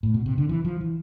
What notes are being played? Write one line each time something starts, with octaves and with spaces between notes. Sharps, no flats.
A2
B2
C3
D3
E3
F3
E3